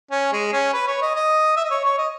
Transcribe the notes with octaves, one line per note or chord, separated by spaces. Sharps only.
C#4
G#3
C#4
B4
C#5
D#5
D#5
E5
D#5
C#5
C#5
D#5